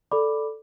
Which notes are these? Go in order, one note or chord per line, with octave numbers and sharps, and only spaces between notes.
A4 D5 B5 D6